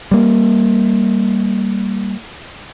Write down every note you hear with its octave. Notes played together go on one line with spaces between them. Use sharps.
G3 A#3